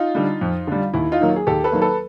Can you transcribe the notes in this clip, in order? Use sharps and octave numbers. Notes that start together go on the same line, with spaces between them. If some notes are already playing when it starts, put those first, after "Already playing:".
Already playing: D#4 F4
D3 G3
F2
D3 G3
D#2 E4
D#4 F4
D#3 F#3 A#3
G#4
D#2 G4 A4
A4 B4
D#3 F#3 A#3
A4 B4